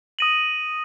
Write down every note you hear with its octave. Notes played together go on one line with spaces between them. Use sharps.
D#6 A#6 D#7 F#7